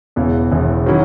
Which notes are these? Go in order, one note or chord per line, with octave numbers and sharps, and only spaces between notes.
E1 E2 C#3 E3
E1 E2 C#3 E3
D#3 F#3 C#4 E4